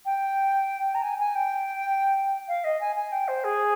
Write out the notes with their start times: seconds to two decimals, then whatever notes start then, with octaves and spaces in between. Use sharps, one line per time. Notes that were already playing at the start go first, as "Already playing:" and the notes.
0.05 G5
0.94 A#5
1.02 G#5
1.19 G#5
1.35 G5
2.48 F5
2.64 D#5
2.80 G#5
2.95 G#5
3.12 G5
3.28 C5
3.44 G#4